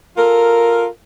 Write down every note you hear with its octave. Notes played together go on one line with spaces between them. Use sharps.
F4 A4 A#4